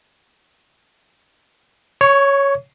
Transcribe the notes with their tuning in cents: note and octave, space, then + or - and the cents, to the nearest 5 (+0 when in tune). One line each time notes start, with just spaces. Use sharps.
C#5 +0 C#6 +25